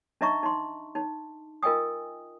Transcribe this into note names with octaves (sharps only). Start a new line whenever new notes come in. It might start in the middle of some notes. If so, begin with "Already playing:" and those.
D4 D#4 D#5 E5 A#5 C#6
D#4 C6
D#4
F4 A#4 D#5 G5 G#5 D#6